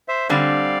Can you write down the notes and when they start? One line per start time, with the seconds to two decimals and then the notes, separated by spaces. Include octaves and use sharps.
0.08 C5 E5
0.29 D3 G3 C4 D5 F5